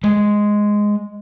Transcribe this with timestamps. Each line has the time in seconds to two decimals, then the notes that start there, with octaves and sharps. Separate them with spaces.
0.04 G#3